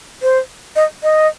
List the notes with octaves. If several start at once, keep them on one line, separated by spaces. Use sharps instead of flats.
C5
D#5
D#5